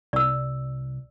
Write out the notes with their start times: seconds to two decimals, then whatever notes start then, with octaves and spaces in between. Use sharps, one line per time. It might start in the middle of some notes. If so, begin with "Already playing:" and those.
0.13 C2 D5 E6